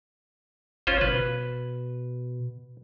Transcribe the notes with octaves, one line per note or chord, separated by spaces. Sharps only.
G1 C#4 F4 C5
B2 B4